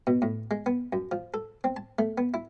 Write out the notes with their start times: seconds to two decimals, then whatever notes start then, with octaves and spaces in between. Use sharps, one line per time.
0.07 B2
0.22 A2
0.51 G#3
0.66 B3
0.93 F#2
1.12 F3
1.34 A4
1.64 C4
1.77 A5
1.99 A3
2.18 B3
2.34 E4